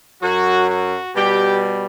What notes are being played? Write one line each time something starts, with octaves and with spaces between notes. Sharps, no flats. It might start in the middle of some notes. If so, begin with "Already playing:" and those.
F#2 F#3 F#4
F#4
B2 G3 G4